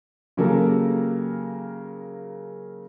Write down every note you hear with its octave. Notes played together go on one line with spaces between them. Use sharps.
C#3 F#3 A#3 G4 A4 A#4